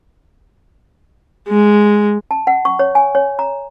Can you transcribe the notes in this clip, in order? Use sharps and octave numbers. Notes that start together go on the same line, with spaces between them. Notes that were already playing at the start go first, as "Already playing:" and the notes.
G#3
A5
F#5
C#6
C#5
G#5
C#5
A#5